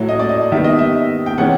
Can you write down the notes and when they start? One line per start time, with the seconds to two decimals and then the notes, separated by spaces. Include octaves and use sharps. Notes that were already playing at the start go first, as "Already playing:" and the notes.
Already playing: A2 F#3 A3
0.09 D#5
0.19 D5
0.29 D#5
0.52 D#3 G3 B3 E5
0.65 D#5
0.79 E5
1.26 G5
1.38 C3 E3 G#3 C#4 F#5